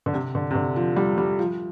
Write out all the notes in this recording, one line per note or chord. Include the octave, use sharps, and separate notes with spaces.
D3
C3
D3
C3
D3
F3
G3
G3
F3